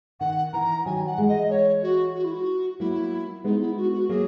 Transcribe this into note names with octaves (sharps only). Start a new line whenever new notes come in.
D#3 F#5
E3 A#5
D#3 F#3 G#5
F#5
E3 G#3
D#5
C#5
F#4
F#4
E4
F#4
F#3 A#3 E4
G#3 B3 D#4
E4
F#4
F#4
F#3 A#3 G#4